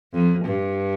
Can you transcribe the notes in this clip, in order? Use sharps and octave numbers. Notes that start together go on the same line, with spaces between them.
F2
G2